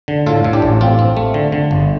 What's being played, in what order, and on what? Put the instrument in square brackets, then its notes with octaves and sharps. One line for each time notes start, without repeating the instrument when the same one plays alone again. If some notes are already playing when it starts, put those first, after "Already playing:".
[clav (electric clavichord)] D3
A2 F4 A4
A2
D4 G4
A1
C4 F4
C4
A3
D3
D3
G1